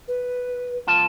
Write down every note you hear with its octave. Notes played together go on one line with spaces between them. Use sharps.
B4
C#2 F4 A5